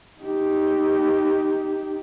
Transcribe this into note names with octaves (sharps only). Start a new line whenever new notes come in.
D#4 G4